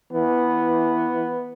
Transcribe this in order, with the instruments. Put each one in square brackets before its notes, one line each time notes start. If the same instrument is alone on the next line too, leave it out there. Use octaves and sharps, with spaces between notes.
[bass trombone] E3 [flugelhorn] B3